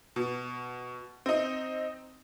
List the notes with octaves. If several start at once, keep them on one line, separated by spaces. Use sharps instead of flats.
B2
C4 D#4